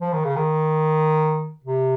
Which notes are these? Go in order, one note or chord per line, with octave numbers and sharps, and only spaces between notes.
F3
D#3
C#3
D#3
C3